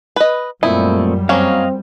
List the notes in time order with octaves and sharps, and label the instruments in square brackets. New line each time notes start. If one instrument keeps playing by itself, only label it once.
[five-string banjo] B4 D#5
[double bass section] F#2 G3 [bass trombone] A#2 [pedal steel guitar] A3 C4 D#5 [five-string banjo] E4
[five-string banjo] F#3 A#3 C#4 [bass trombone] C4 [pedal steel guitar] D#5 F5